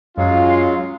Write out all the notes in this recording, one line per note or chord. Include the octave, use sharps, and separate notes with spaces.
F#2 F#3 G#3 C#4 F4 F5